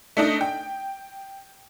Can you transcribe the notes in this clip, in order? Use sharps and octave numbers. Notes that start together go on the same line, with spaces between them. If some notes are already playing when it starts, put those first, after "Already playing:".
A3 D4 D#4
G5